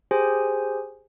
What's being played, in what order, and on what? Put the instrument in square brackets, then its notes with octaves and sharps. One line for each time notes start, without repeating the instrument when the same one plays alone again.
[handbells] G4 G#4 C5 G#5